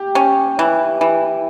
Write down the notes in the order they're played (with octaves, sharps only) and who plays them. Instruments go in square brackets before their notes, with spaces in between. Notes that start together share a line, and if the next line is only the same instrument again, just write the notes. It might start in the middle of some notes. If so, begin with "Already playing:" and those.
Already playing: [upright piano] G4
[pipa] C#4
E3
E3